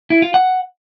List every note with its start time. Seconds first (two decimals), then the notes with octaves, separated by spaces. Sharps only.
0.10 E4
0.22 F4
0.34 F#5